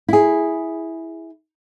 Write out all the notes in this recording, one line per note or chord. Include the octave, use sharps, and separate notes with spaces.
E4 G#4